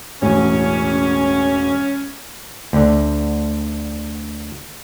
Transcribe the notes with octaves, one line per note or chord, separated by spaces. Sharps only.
E1 A1 C#4
D2 D3